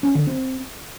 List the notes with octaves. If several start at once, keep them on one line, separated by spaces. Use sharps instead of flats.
C#4
D3
C4